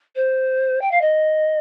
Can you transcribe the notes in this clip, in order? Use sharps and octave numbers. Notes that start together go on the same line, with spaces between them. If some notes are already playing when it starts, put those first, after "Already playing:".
C5
G5
F5
D#5